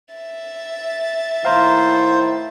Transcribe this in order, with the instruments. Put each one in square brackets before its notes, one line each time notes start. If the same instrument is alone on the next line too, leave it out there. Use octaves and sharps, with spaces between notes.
[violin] E5 A6
[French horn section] A2 D#3 E4 [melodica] C5 [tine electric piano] F5 A#5 C6